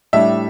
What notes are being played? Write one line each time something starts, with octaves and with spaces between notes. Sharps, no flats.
A2 G3 D4 E5